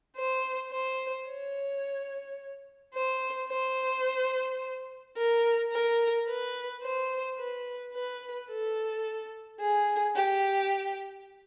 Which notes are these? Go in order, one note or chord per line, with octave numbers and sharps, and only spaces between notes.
C5
C5
C#5
C5
C5
A#4
A#4
B4
C5
B4
B4
A4
G#4
G4